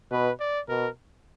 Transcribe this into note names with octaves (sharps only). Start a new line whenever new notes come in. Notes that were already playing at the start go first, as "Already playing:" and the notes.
B2 B4
D5
B2 A#4